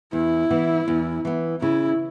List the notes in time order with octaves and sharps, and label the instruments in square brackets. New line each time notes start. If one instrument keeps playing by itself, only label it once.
[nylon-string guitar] E2 [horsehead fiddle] E4
[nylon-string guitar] E3 B3
E2
E3 B3
[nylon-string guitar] C#3 [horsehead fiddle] E4